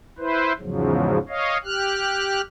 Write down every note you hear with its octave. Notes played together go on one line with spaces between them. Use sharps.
E4 B4 C5
E2 G#2 C#3 F3 F#3
C#5 D#5 F5
G4 F6 F#6